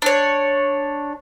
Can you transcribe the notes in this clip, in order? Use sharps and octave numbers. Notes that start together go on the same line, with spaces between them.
D4 C#5